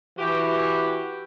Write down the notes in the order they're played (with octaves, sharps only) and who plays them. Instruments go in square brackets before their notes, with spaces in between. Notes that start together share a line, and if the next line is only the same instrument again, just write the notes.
[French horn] E3 [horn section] F#4 G4